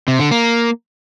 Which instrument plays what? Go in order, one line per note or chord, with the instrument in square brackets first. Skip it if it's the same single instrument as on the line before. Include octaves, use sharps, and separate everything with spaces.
[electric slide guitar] C3
D3
A#3